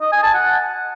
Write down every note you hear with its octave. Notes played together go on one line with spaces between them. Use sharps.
D#5
G#5
A5
F#5